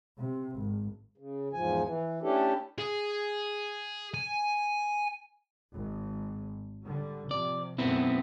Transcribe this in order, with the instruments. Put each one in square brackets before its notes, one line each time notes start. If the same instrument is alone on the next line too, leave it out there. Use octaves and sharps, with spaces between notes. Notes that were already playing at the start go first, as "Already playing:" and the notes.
[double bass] C3
G#1
[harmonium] C#3
E2 G#2 F3 G#5
E3
A3 C#4 D4 E4 G4 A4
[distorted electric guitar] G#4
G#5
[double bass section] G#1
D3 G3
[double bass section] C3 F3 [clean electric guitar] D5
[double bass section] F#2 B2 A3 [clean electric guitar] B3 C4 E4